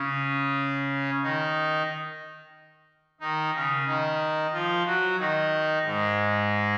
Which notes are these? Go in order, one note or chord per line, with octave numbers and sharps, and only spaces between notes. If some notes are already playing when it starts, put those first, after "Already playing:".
Already playing: C#3 C#4
D#3 D#4
D#3 D#4
C#3 C#4
D#3 D#4
F3 F4
F#3 F#4
D#3 D#4
G#2 G#3